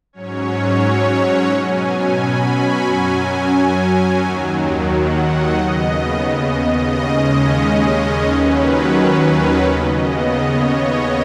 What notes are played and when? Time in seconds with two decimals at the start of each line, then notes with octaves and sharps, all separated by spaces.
0.13 G#2 F#3 C#4 C#5
1.14 F#5
1.48 B2 F#3 C#4 G#5
2.16 B5
2.50 C#6
2.85 F#2 F#3 C#4 G#5
4.21 D#2 D#3 F#3
4.88 F#5
5.23 D#5
5.57 D#2 C#3 B3
6.25 D#5
6.92 D#2 C#3 G#3 C#4 D#5
8.28 D#2 D#3 F#3 C#4 B4
8.97 B4
9.64 D#2 C#3 B3 D#5
10.32 C#5